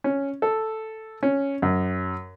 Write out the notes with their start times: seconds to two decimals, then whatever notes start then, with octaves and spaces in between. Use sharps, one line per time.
0.04 C#4
0.42 A4
1.23 C#4
1.62 F#2